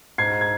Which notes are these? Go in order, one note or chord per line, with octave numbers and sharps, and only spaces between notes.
G#2 G#6 C7
G#6